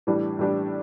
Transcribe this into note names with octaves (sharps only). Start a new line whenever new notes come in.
A2 E3 G3 D4 G4
A2 E3 G3 D4 G4